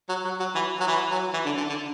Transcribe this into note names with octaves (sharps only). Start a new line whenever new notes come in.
F#3
F#3
F#3
E3
F#3
E3
F#3
E3
D3
D3
D3